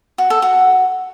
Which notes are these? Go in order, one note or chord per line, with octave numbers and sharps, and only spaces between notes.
F#4
A4
F#4